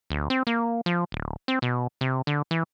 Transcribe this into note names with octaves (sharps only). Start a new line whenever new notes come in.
D2
C4
A#3
F3
D1
C4
B2
C3
D3
E3